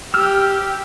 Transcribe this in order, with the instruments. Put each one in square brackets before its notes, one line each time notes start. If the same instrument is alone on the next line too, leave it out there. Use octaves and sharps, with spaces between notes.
[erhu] G4 [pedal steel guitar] E6 F6